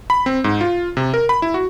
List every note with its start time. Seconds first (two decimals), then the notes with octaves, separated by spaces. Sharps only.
0.10 B5
0.26 C4
0.44 G#2
0.61 F4
0.97 C3
1.14 A#4
1.29 B5
1.42 E4
1.54 F#4